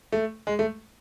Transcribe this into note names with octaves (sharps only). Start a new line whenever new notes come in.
A3
G#3
A3